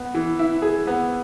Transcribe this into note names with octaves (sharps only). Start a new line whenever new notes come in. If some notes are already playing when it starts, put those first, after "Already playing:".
Already playing: B3
E3
E4
G#4
B3